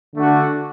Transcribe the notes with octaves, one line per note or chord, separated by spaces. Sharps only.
D3 A3 D4 F#4